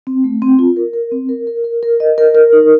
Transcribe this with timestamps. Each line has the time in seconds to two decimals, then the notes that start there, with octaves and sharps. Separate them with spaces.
0.07 C4
0.24 A3
0.42 C4
0.59 F4
0.77 A#4
0.94 A#4
1.11 C4
1.29 A#4
1.47 A#4
1.64 A#4
1.83 A#4
2.00 D#5
2.18 A#4
2.35 A#4
2.53 D#4